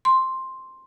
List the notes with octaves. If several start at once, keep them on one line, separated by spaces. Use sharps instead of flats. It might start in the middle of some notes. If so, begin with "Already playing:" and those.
C6